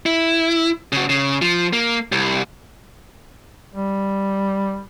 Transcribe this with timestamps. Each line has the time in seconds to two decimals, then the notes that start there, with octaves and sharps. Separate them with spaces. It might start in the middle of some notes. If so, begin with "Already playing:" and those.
0.06 E4
0.92 C#3 F#4
1.09 C#3
1.42 F3
1.73 A#3
2.12 C2
3.74 G3